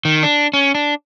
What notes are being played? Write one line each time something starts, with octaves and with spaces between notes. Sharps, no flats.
D#3
D4
C#4
D4